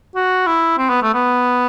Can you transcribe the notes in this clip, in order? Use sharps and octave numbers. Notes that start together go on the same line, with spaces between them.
F#4
E4
C4
B3
A3
B3